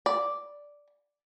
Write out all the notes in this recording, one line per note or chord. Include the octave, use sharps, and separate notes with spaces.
D5